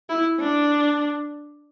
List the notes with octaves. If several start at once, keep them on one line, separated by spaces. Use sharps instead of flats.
E4
D4